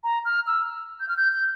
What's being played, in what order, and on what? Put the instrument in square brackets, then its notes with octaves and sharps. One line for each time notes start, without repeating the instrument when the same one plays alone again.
[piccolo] A#5
F6
E6
G6
F6
G6
G6